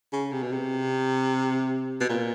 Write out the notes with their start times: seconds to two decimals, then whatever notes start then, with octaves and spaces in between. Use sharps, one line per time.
0.13 C#3
0.32 C3
0.43 B2
0.52 C3
2.00 B2
2.09 A#2